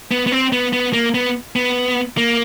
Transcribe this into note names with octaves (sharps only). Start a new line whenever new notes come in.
B3
B3
C4
B3
B3
A#3
B3
B3
A#3